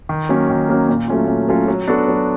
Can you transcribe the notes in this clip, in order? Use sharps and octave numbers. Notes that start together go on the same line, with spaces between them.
D#3
F#3 A#3 C#4
D#3
F#3 A#3 C#4
A#2
F#3 A3 C#4 F4
A#2
F#3 A3 C#4 F4
F#3
B3 D4 F#4 A4
F#3